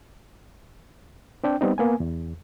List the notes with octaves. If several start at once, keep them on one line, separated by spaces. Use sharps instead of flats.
C4 D4 G5
G3 B3 C4 D#4
A#3 B3 G#5
E2